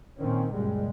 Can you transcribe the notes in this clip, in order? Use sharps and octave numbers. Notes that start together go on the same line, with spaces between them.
A#2 D#3 C4 C#4
F#1 C#2 A#2 G3 G#3